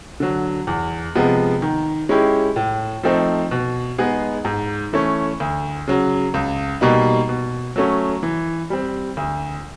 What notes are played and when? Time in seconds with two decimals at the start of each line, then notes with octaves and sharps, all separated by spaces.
0.20 D3 F#3
0.67 E2
1.15 C3 F3 G#3 B3
1.62 D#3
2.09 G#3 C#4 E4 G4
2.56 A2
3.03 F3 A3 C4 D#4
3.51 B2
3.98 G#3 B3 D#4 G#4
4.45 G#2
4.93 E3 A3 C#4
5.40 D2
5.87 C#3 F#3
6.34 C#2
6.81 B2 G3 A#3 D#4
7.29 B2
7.76 F#3 A3 C#4
8.23 E3
8.70 G3 C4
9.17 D2